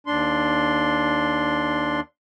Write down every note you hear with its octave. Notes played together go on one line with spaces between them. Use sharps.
D#2 D4 C6